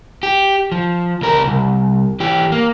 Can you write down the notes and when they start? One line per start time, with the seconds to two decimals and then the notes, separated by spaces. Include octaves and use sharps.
0.23 G4
0.72 F3
1.22 C#2 A#4
1.47 C2
2.20 E3 G4
2.52 A#3